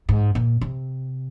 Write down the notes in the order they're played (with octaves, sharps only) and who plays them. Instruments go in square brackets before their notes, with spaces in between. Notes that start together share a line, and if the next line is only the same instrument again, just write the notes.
[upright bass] G#2
A#2
C3